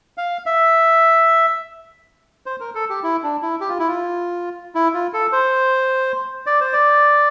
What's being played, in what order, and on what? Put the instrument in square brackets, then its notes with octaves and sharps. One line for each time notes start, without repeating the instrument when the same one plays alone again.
[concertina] F5
E5
C5
A#4
A4
G4
E4
D4
E4
G4
F4
E4
F4
E4
F4
A4
C5
D5
C5
D5